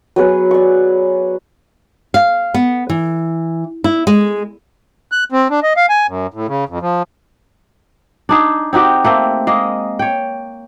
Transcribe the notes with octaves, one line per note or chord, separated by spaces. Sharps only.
F#3 B3 G#4 B4
D5 C#6
F5
B3
E3
E4
G#3
F#6
C4
D4
D#5
F5
G#5
F#2
A2
C#3
F2
F3
D4 D#4 G#4
C4 D#4 F#4 G4
A3 A#3 C4
G#3 A#3 D#5
C#5 G5